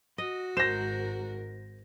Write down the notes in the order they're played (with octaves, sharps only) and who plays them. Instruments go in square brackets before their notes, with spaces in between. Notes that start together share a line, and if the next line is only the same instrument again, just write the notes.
[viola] F#4 [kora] D#5
[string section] G#1 G#2 A#4 [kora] C5 [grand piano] A#6 E7